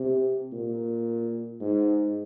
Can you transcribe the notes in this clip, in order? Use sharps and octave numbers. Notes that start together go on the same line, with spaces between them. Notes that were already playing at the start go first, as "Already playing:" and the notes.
Already playing: C3
A#2
G#2